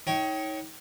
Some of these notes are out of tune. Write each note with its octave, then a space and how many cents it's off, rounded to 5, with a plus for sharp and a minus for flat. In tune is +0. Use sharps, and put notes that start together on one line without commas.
D#4 +30 C#5 -5 G5 -20